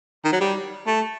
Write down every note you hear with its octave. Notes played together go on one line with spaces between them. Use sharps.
D#3
F#3
G3
A3